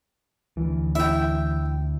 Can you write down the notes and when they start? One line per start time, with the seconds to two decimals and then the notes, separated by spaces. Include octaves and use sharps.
0.57 D2 E3
0.95 E4 E5 G5